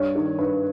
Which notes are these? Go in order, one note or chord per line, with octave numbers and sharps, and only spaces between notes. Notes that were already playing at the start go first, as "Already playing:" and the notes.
Already playing: G2 C#5
D#3
G2 B4